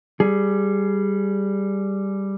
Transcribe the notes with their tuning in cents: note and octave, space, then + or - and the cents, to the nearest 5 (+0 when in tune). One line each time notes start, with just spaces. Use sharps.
G3 +0 G#4 +10